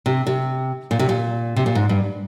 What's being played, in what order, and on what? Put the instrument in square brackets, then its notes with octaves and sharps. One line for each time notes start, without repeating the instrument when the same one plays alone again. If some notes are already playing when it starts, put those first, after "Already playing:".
[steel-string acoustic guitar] C3
C3
A#2
C3
A#2
C3
A#2
G#2
G2